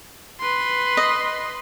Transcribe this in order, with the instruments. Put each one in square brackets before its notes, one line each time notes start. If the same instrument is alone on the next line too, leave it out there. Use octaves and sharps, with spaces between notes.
[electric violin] B4 C6
[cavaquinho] D#5